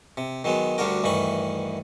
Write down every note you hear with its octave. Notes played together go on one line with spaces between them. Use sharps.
C3
D#3 F#3 G#3 B3
D2 D3 G3 D4 F#4 A#4
D2 G2 D#3 E3 B5 C#6